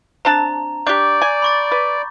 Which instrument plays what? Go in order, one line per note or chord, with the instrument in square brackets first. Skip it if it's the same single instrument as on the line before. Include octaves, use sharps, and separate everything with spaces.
[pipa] C4 D4 A5 [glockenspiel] A#5
[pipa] D4 G4 [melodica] D5 [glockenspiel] C#6 D6 G6
[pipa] G#5
[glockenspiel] B5 C#6 A6
[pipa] B4